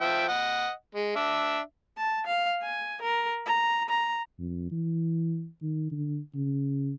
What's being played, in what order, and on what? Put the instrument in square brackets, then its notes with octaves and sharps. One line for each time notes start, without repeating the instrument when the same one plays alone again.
[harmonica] F3 E5 G5
D#5 F#5
G#3
D4 E5
[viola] A5
F5
G#5
A#4
A#5
A#5
[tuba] F2
E3
D#3
D3
C#3